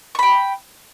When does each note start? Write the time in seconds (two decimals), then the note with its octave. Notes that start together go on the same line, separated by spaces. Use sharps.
0.15 C#6
0.19 B5
0.23 G5